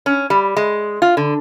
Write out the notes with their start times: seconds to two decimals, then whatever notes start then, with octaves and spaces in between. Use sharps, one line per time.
0.06 C#4
0.30 G3
0.57 G#3
1.02 F4
1.17 D3